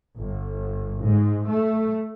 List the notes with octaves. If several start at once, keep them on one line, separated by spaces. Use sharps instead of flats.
G1
G#2
A3